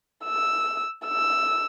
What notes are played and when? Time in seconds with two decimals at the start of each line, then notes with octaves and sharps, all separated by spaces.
0.25 E6
1.06 E6